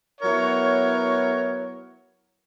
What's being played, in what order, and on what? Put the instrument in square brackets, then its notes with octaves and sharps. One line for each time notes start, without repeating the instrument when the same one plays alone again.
[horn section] F#3 B3 E4 A#4 C#5